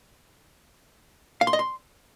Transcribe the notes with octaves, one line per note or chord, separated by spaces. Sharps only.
F5
C6
D#5
C6